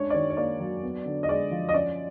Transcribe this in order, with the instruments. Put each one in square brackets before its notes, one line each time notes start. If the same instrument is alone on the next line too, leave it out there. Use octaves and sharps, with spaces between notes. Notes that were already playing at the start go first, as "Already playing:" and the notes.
Already playing: [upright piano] G#3 C#4 D4 C#5
D5
D#3 C#5
C#5
A#3 D5
F#3
B3
D3
D#5
G#3 D5
F3
D#5
C#4 D5